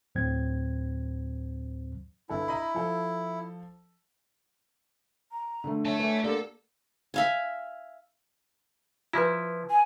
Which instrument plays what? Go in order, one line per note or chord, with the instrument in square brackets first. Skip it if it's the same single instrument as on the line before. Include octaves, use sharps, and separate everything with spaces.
[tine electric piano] D2 A2 F#3 C4 C5 G#6
[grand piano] G1 A4 [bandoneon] E4
[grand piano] D#5 A#5 B5
F3 A4
[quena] A#5
[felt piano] D3 A3
[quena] C#5 [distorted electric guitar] E5 A5
[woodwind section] D3 E3 [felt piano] A3
[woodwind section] D3 [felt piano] A#3 [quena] G4 [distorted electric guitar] A4
[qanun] E5 F5 G#5
[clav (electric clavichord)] F3 E4 [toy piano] F4 B4
[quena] G#5